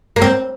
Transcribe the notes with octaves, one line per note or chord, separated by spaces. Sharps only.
A#3
C4